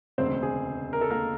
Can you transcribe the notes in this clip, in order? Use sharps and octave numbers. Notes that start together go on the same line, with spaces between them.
E1 D2 C#3 C4 C5
G#4
A#4
A4
A#3 A#4